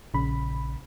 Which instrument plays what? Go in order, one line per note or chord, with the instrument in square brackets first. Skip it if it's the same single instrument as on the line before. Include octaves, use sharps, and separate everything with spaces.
[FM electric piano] A#1 C#3 B5